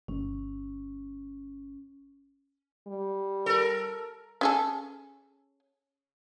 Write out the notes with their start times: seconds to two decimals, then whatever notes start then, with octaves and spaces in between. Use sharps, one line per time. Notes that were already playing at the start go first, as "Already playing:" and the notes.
0.08 G1 C#4
2.87 G3
3.46 A4 A#4
4.41 C#4 G#4 A4